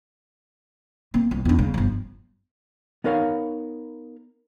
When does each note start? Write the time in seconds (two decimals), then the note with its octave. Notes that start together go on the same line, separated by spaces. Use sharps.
1.14 A#3 C4
1.31 C2
1.45 E2 D4
1.59 C#3 G#3
1.74 G1 F3
3.04 B3 D#4 A#4 C#5 F5